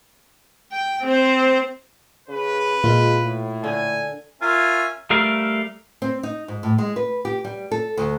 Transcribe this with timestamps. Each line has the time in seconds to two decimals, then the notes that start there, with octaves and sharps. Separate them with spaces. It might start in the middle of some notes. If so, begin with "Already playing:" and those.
0.72 G5
1.03 C4 C5
2.29 C#3 B4
2.84 A#2 G#3 F4
3.23 A2
3.64 D3 G#5
4.42 C#4 F4 A#4 E5 G#5
5.10 G3 A3 A#4 F5
6.02 C4
6.23 D#4
6.48 G#2
6.63 A2
6.78 G#3
6.96 B4
7.25 G4
7.45 G3
7.71 A4
7.97 D2